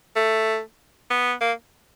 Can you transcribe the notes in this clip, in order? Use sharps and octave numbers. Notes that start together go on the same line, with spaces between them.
A3
B3
A#3